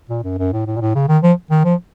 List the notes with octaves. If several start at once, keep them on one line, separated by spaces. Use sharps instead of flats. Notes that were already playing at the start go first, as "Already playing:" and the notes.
A#2
F#2
F#2
A2
A2
A#2
A2
C#3
D#3
F3
D#3
F3